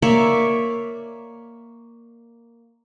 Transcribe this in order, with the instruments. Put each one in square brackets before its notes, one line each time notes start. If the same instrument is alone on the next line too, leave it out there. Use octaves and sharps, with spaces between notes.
[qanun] A#3 C#5 D5 E5